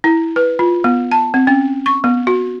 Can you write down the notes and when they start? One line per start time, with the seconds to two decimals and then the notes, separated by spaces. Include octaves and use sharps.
0.04 E4
0.36 B4
0.59 F4
0.84 B3
1.12 A5
1.34 C4
1.47 C#4
1.86 C#6
2.04 B3
2.27 F#4